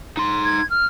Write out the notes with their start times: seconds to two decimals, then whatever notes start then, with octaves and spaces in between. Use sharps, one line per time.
0.17 D#4 C6
0.44 G#6
0.70 F6